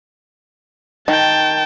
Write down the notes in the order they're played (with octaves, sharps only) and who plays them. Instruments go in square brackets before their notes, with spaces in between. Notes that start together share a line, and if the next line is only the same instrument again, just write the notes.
[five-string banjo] D#3 [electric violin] G5 A5